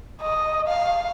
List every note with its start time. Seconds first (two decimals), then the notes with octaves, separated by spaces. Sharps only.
0.22 D#5
0.68 F5